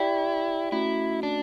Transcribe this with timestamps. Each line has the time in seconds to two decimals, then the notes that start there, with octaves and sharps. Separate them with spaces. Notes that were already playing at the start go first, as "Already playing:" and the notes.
Already playing: E4 G4 D5 G5
0.72 A3 C#4 E4 F#4
1.23 D4